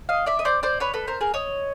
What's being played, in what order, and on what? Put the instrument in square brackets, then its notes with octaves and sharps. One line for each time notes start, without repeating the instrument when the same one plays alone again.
[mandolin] D#5 F5
D5 E5
D#5
C5 D5
C5 D5
B4 C#5
A4 B4
A#4 C5
G#4 A#4
C#5 D#5